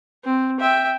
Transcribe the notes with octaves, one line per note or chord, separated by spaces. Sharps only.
C4
E5 G5